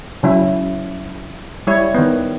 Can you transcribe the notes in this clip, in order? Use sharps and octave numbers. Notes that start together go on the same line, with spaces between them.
C#3 F#3 E4
G3 E4 C#5
D#3 B3